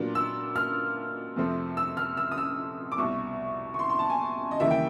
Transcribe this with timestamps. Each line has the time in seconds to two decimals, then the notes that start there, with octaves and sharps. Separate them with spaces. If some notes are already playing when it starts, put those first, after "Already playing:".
Already playing: A#2 F#3 B3 D4 F4
0.15 E6
0.56 F6
1.36 F2 C3 F3 A3 C4
1.77 E6
1.97 F6
2.17 E6
2.32 D#6
2.38 E6
2.92 D6
2.98 C2 B2 G3 C#6
3.74 C#6
3.79 C6
3.89 C6
3.99 A5
4.10 G#5
4.51 D#5
4.60 D#2 C#3 E3 G3 A#3 E5
4.71 G5